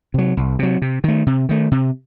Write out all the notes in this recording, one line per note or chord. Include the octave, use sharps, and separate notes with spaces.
C3 F#3
C2
C3 F#3
C3
D#3 A3
C3
D#3 A3
C3